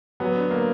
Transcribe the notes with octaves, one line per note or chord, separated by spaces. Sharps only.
F#3 B3
D3
A#3